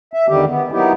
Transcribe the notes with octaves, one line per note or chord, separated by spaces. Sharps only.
E5
E2 D3 D#3 G3 G4
B3
F#3 A#3 B3 D#4 E4 G4